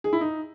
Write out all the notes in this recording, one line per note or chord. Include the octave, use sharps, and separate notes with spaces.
G#4
E4
D#4